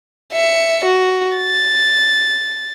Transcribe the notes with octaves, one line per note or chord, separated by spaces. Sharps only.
E5 C#7
F#4
A6